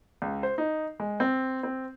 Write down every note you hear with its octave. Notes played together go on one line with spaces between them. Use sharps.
C#2
C5
D#4
G#3
C4
C4